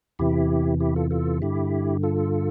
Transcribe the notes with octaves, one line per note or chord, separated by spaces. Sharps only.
E2 C3 E3 E4 G4
E4 G4
F4 A4
F4 A4
G2 D3 E4 G4
F4 A4